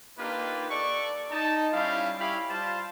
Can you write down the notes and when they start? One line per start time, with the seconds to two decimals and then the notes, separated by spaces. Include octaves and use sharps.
0.18 A#3 D4 D#4 F4 G4 B4
0.70 A4 D5 C#6
1.30 D#4 A5
1.72 G3 C#4 E4 F4 F5
2.19 G3 E4 G4 C#5 F5 B5
2.50 G3 F4 C5 F5 A5